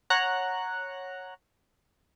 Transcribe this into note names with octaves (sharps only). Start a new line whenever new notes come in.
C#5 F#5 A#5 F#6